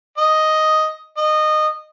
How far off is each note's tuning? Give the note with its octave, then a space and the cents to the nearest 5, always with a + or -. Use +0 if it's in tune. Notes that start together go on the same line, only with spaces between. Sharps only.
D#5 +5
D#5 -20